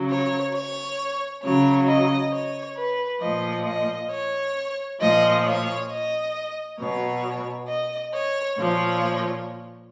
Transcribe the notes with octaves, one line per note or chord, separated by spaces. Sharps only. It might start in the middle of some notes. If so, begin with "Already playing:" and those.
Already playing: C#3 F#3
C#5
C#5
C#3 F#3 C#5
D#5
C#5
B4
A#2 F3 D#5
D#5
C#5
A#2 F3 D#5
C#5
D#5
B2 F#3 C#5
D#5
C#5
A#2 F3 C#5